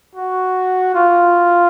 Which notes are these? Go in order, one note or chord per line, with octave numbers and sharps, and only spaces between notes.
F#4
F4